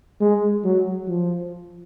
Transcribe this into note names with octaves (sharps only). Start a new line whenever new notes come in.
G#3
F#3
F3